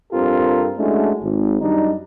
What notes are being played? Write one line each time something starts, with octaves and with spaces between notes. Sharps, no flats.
G2 C4 F4 G4 A4 A#4
G#3 A3 C#4 D4 E4 F#4
G#1
F#2 G3 D4 D#4